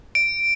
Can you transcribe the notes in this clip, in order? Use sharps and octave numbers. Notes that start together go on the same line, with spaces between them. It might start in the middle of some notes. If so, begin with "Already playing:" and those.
D7